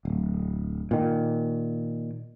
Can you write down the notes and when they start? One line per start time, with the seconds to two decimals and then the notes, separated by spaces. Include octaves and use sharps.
0.05 D1
0.91 A#2 D#3